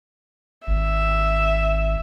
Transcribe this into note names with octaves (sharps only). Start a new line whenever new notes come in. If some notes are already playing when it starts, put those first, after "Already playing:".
G#1 E5